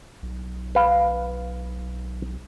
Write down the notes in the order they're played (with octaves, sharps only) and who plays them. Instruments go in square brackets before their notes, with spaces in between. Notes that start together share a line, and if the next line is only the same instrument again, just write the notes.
[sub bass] B1
[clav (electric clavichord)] B4 F5